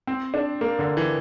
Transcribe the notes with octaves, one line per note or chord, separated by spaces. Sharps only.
C4
D4
A#3
D3
E3